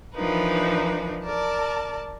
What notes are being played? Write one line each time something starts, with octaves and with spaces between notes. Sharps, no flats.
E3 F3 D4 D#4 A#4 B4
A#4 D5 A5